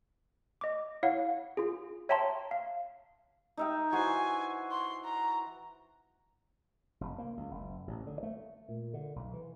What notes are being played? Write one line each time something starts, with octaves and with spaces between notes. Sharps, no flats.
D#5 D6
E4 C#5 F5 F#5
F4 G#4
C#5 E5 G5 A5 A#5 C6
F5
D#4 E5 G5
E3 F#4 C5 G#5
C6
A#5
F1
A#3
C#2
F#1
A1
D3
A3
A#2
D3
B1
E3